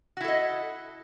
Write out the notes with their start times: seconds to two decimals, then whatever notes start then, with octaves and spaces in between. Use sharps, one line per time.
0.17 F#4
0.21 E4
0.24 A4
0.28 D#5